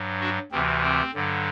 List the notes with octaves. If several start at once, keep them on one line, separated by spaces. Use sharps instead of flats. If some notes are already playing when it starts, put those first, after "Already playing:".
Already playing: G2 F#3
D4 F#4
D2 C3 E3 C4
C4
G2 D3 F#3